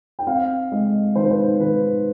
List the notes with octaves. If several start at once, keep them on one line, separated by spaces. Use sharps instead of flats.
G5
C4 F5
G#3 D#5
D#3 C5
B4
C5
D#3 B4